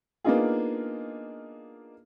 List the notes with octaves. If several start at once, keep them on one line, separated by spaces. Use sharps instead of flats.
A#3 B3 D4 D#4 F4 G#4